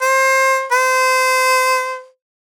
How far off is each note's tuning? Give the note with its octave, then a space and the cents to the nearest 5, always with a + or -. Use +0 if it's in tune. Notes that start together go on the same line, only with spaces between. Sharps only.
C5 +25
C5 -25